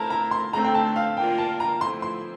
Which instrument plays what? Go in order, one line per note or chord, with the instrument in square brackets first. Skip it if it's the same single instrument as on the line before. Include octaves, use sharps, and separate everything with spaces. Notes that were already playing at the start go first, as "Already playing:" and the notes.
Already playing: [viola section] A3 C4 E4 A#4 [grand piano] A5 A#5
[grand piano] A#5
C6
[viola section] D3 A3 C4 [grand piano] A#5
[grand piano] G5
A5
F5
[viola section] A#3 F4 A#4 D5 [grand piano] G5
[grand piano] A5
A#5
[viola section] F3 A3 C4 E4 [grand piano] C6
[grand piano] C6